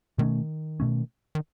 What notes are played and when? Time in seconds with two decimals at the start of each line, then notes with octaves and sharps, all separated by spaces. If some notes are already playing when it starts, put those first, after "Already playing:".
0.18 B2 D#3 A3 C#4
0.80 B2 A3 C#4
1.35 D#3